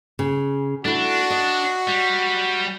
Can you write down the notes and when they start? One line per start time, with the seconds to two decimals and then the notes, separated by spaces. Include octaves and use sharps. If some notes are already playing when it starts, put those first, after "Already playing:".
0.19 C#3
0.85 A3 D4 E4 F#4
1.30 D#5
1.87 G3